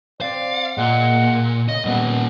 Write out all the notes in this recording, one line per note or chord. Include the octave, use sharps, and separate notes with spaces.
C4 D5 F5
A#2 G#3 A#3 F#5
C#3 D#5
A#2 G3 B3